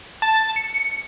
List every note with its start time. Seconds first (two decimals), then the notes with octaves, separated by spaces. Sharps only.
0.22 A5
0.56 C#7